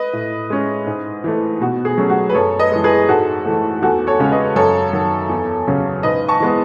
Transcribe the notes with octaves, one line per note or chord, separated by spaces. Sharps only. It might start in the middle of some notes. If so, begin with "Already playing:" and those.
Already playing: B4 D#5
A2
G#3 C#4
G#2
E3 A3
B2 F#4
G#4
F#3 A3 C#4
F#4
B4
F#2 A4 C#5
B4 D#5
E3 G#3
G#4 B4
G#2 F#4 A4
E3 A3
E2 F#4 A4
A4 C#5
C#3 G#3 C#4
B4 D#5
F#2 A4 C#5
D#3 F#3
E2
C#3 F#3 C#4
G#2 B4 D#5
A5 C#6
E3 G#3 B3